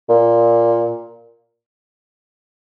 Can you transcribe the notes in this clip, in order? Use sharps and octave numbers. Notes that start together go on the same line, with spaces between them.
A#2